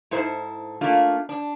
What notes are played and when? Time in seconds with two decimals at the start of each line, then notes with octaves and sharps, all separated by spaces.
0.11 G#2 E4 A4 C5
0.81 A3 A#3 D4 F4
1.29 D4